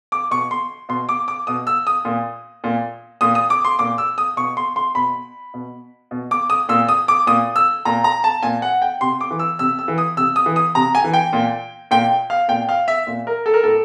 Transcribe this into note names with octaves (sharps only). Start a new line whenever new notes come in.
D6
B2 C#6
C6
B2 C6
D6
D6
B2 D#6
E6
D#6
A#2
A#2
A#2 D#6
D#6
D6
C6
A#2 D6
E6
D#6
B2 C#6
C6
C6
B2 B5
B2
B2
D6
D#6
A#2 E6
D#6
D6
A#2 D#6
E6
A#2 A#5
A#5
A5
A#2 G#5
F#5
G5
C3 C6
D6
E3
E6
C3 E6
E6
E3
D#6
C3 E6
D#6
E3
D#6
C3 A#5
G#5
E3
G5
A#2
A#2 G5
F5
A#2 G5
F5
E5
A#2
A#4
A4
A#4
A2 A4